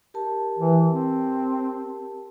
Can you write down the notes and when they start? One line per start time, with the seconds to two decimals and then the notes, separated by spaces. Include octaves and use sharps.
0.14 G4 A#4 A5
0.59 E3
0.90 C4